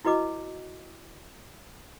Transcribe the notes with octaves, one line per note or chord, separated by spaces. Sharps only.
E4 F#4 B4 D#5 D6